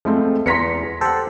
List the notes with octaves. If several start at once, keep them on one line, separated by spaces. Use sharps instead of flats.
F3 G#3 A3 C4
E2 B3 A#5 C6 G#6 A#6 B6 C#7
G4 A4 C5 F#5